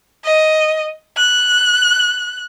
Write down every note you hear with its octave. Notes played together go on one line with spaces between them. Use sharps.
D#5
F#6